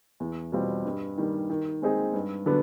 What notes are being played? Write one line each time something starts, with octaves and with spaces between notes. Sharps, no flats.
E2
B2 G3 C4 F4
G2
D#3 G3
D#3
G#3 C4 D#4 G#4
G2
D3 F#3 B3 D4